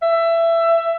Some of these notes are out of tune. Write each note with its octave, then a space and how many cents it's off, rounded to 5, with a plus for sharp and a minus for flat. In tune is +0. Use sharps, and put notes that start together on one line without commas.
E5 +20